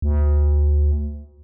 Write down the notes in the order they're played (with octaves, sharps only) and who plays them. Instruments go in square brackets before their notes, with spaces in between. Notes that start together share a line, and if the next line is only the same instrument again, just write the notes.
[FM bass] D2